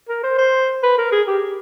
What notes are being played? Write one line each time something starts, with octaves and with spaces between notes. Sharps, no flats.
A#4
C5
C5
B4
A#4
G#4
G4